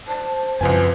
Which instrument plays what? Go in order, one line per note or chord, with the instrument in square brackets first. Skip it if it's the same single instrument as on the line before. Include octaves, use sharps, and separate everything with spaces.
[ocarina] C5 [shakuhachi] A5
[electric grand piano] C2 F3 G#5 [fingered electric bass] F#2 C#3 [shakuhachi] B4